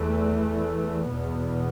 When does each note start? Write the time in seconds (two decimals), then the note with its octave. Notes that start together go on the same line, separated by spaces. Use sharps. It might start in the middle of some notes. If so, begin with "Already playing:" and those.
Already playing: E2 E3 A3
1.09 E2 B2 B3